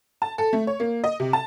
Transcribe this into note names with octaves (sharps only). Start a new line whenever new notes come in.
A5
A4
A3
C#5
A#3
D#5
C3
A5